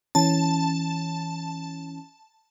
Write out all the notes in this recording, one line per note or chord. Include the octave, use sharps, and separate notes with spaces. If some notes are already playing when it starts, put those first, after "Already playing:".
E3 C#4 A5